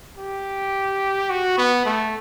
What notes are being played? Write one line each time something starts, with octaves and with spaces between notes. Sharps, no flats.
G4
F#4
B3
A3